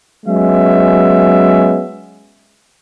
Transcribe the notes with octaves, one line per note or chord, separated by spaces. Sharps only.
F#3 G#3 B3 C#4 E5